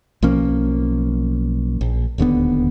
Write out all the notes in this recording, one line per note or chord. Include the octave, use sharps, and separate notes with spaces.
B1 F3 A#3 C#4
A#1
D1 D#2 D3 B3